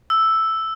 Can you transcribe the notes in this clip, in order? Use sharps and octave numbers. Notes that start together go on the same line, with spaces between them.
E6